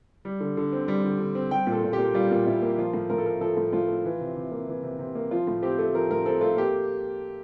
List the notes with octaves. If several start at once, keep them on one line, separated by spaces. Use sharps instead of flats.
G3
D3
D3
C4
G3
D3
D3
C4
G3 G5
A#2
A4
A#2
G4
A#3
G3 F4
A#2
A#2 E4
A#3
F3 F4
A2
A2 A#4
A4
A3 A#4
F3 A4
A2
A2 F4
A3
E3
C3
C3
A#3
E3
C3
C3
A#3
F3 F4
A2
C4 G4
A3
F3 A#4
A2 A#4
C4 A4
A3 F4
A#3 G4